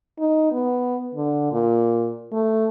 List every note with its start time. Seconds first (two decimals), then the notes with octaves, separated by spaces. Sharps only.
0.19 D#4
0.52 B3
1.15 D3
1.52 A#2
2.33 A3